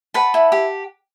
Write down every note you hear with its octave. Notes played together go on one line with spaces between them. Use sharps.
B4 F#5 A5
E4
G4